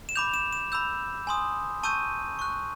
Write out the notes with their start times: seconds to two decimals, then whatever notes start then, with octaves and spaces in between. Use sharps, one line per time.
0.09 E7
0.15 B5 D6 G6 F7
0.34 E7
0.53 E7
0.72 B5 E6 G6
1.27 G#5 C6 D#6
1.83 A5 C#6 E6 G6 D#7
2.39 C#6 F#6